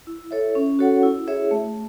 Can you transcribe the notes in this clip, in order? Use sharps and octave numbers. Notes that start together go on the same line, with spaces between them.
E4
A4 C#5 E5
C#4
F#4 A4 C#5 F#5
E4
G#4 C#5 E5
A3